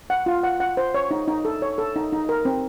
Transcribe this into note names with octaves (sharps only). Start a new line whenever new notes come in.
F#5
F4
F#5
F#5
C5
C#5
D#4
D#4
A4
C#5
A4
D#4
D#4
A#4
C4